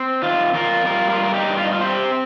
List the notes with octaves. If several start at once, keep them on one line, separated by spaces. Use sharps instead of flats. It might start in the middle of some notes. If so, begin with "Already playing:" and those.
Already playing: C4
D#3 F4
F2 F4 A#4
G3 F4 A#4
F4 A#4
G2
A#4
D#4 G4
G2
F4
D#4
F4
C4 G4 C5